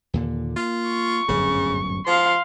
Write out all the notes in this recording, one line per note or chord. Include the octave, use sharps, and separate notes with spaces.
D#2 A#2 D3
A#3 F4
C#6
D1 G1 F#2 C#3
F3 F5 C6